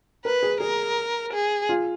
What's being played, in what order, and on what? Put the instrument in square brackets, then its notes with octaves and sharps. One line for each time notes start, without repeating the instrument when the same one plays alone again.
[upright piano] A#4 [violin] B4
[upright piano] G#4
[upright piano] G#4 [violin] A#4
[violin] G#4
[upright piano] F4